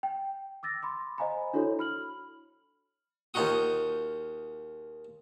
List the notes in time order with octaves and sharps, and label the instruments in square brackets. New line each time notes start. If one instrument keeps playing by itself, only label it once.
[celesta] G5
D6 E6 A6 A#6
B5 C6 D6
C5 D#5 F5 G#5 A#5 B5
D4 E4 F#4 A4 C#5
B5 F6 F#7
[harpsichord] D#2 D#4 F4 F#4 D#6